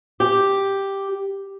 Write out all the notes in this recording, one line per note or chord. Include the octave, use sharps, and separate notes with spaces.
G4